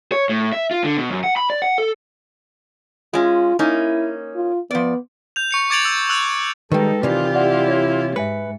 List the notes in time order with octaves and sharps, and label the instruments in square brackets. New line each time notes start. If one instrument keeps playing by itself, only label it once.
[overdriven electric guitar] C#5
A2
E5
F4
D3
B2
F#2
F#5
B5
D5
F#5
A4
[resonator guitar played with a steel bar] G#3 C#4 [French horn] F4
[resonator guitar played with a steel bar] A#3 C#4 D#4 [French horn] E4
[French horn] F4
[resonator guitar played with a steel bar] F3 D5 [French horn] B3
[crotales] G6 F7
C#6 C#7 F7
D6 G#6 A6 D7 F7 F#7
E6
E6 F#6 F7
[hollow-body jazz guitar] D#3 G3 [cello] G#3 D#4 [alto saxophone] A4 [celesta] B4 G5
[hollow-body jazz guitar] C3 E3 [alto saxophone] D#3 [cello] F4 G4 [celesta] D5
[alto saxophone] E4 [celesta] D5 F#5
[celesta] C#5 G#6
[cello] G#2 [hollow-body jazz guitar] B4 [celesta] E5 G#5 C#7